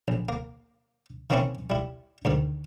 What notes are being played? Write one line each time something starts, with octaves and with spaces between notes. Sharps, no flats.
A#1
A#3
D#3 E3 A#3 C4 C#4 E4
G3 E4
D2 G#2 D#3